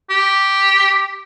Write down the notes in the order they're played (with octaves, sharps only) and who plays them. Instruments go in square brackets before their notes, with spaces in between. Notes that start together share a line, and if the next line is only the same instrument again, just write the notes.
[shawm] G4